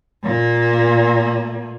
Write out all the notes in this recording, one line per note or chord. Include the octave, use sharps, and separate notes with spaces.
A#2 A#3